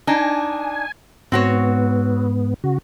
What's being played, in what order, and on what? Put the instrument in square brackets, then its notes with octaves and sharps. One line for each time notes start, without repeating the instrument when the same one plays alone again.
[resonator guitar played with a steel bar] D4 D#4 [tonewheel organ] G#5
[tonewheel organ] G#2 B3 [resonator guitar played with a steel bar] C4 F#4 C#5
[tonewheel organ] C#3 F#4